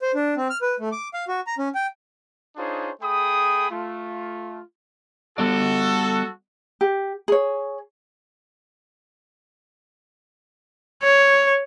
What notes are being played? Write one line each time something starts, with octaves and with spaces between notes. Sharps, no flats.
C5
D4
C4
F6
B4
A3
D6
F5
F#4
A#5
C#4
G5
D4 D#4 F4 G#4 C5 C#5
A3 G#4 G5 B5 D#6
A3 F4
G3 B3 F#4 A4 D5
G4
G#4 C#5
C#5